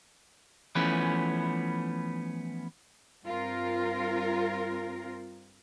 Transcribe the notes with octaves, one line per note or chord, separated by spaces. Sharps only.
E3 F3 A3 B3 C#4
G2 C4 F4 A#4